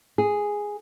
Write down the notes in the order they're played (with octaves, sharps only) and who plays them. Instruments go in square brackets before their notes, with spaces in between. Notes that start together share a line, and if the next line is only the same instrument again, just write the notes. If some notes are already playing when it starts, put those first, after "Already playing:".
[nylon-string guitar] G#4